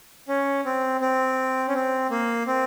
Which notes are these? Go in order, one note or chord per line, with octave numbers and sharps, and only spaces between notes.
C#4
C4
C4
C#4
C4
A#3
C4